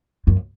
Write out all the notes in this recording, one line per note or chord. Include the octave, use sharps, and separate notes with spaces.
F#2